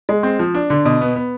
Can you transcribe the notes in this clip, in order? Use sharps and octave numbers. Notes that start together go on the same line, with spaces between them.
G#3
C4
F3
D4
D3
B2
B3
B3